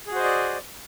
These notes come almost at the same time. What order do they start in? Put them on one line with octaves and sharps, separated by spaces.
G#4 F#4 C5 D#5 D5